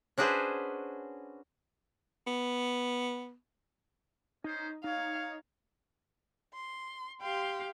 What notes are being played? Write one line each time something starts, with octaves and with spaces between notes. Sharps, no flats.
C#4 D4 F#4 G#4 B4 C5
B3
C#4 D#4 C5
D#4 C#5 F5
C6
G4 F5 G5 C6